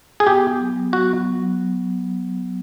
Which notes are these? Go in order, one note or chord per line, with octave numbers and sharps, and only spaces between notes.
G#4
B3 G4
B3
F#3
F#3
F#3 F#4
B3
F#3